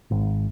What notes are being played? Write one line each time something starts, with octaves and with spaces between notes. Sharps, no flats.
G#1